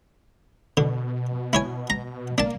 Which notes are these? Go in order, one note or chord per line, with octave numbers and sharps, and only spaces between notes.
B2 D3
E4 C#5 G#5
A#5
A#3 D4 A5